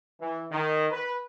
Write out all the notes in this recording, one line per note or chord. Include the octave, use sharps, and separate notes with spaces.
E3
D#3
B4